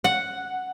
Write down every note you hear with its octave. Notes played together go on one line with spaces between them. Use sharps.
F#5